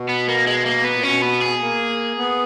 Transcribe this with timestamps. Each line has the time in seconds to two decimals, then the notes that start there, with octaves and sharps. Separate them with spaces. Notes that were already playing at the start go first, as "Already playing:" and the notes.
Already playing: B2
0.09 B3
0.28 A#3
0.47 G#3
0.65 A#3
0.84 B3
0.94 A#2
1.03 B2 C#4
1.22 B3
1.42 G#4
1.61 A#3
2.18 B3